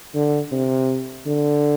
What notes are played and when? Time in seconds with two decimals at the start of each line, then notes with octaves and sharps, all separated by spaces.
0.14 D3
0.52 C3
1.26 D3